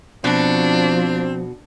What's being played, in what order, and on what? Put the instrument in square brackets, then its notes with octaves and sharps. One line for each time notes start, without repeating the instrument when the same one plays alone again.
[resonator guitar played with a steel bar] B2 F#4 [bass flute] F3 [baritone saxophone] C4 [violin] D4